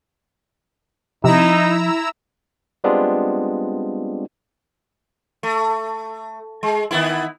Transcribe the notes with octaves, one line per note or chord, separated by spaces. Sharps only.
C3 F3 D#4 E4 A#5 E6
G3 G#3 B3 C4 D4 F4
A3
G#3
D#3 B3 E4